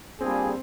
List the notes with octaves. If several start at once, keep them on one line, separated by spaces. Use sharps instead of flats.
G3 A#3 C4 D4 F4 G#4